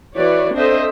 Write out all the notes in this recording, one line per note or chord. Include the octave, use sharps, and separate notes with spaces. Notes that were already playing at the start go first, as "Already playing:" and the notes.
E3 F#4 B4 C#5 D5
C4 D4 A4 C5 D#5 E5